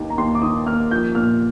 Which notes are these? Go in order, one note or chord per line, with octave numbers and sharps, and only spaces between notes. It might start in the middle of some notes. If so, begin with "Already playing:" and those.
Already playing: D#2 D#3 A#3
A#5
D#2 C6
D6
D#3 D#6
A#3 F6
F3 G6
A#2 F6